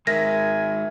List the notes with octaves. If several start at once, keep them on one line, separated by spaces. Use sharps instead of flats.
D#3 G#3 A#4 E5 G#5 A#6